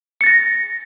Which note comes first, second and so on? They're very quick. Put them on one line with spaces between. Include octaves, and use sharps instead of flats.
C#7 A6 A#6